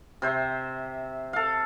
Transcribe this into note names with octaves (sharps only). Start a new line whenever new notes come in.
C3 C5 E5
A4 F5